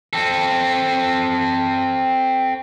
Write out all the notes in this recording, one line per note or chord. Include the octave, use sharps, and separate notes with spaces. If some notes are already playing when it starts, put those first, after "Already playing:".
C4 A4